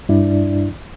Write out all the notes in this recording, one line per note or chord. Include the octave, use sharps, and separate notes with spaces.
G2 D4 E4 D5